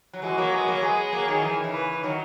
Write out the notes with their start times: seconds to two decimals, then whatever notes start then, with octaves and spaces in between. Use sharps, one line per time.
0.13 F#3
0.22 E3 G#3 F#4
0.38 F#3 A#3
0.52 G#3 B3
0.68 F#3 A#3
0.82 G#3 B3 G#4
1.13 F#3 A#3
1.28 D#3 F#3
1.43 E3
1.53 D#3
1.64 C#3 E3
1.73 B4
2.03 D#3 F#3